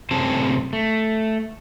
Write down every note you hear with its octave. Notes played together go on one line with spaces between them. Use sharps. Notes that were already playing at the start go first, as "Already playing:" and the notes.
F#2 A2 C3 C4 G#4 A5
A3